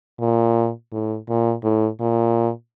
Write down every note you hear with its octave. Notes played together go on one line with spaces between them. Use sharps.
A#2
A2
A#2
A2
A#2